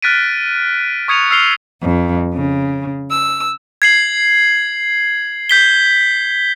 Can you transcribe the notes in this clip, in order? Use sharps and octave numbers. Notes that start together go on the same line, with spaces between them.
F6 F#6 A6 B6 D7 D#7
C#6 D#6 G#6 C#7 D#7 F7
E6 F6 C7 F7 G7
F2
C#3
E6
G#6 C7 F#7
G6 B6 G7